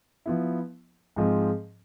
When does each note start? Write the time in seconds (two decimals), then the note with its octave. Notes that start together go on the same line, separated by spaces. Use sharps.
0.26 F3 B3 E4
1.16 G#2 F3 G#3 C4